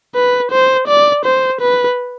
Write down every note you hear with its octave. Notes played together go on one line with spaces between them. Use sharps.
B4
C5
D5
C5
B4